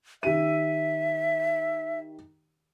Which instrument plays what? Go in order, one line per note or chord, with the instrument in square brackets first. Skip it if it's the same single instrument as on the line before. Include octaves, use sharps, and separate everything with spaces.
[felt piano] D#3 G4 D#7 [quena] E5